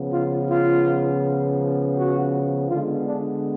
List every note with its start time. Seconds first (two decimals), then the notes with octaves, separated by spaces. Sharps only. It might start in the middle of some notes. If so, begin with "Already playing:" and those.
Already playing: C#3 F3 B3
0.13 F4
0.51 F4
1.97 F#4
2.70 D3 G#3 B3 F4
3.07 D4